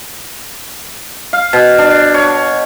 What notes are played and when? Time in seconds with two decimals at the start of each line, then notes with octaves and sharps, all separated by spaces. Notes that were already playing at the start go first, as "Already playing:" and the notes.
1.33 F5
1.53 B2
1.78 D4
2.14 C#5